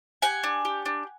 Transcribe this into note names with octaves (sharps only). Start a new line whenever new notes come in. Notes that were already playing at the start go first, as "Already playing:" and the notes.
G4 F#5 G#5
D4
G4
D4